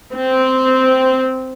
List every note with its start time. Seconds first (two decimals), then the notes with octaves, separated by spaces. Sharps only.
0.12 C4